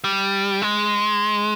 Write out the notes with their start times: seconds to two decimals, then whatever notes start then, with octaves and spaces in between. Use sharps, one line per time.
0.04 G3
0.62 G#3